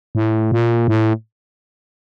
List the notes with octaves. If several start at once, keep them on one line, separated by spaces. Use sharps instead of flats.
A2
A#2
A2